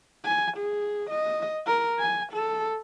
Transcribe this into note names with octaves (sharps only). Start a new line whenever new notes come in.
G#5
G#4
D#5
A#4
G#5
A4